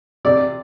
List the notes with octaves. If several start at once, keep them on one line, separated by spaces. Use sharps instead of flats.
C3 D5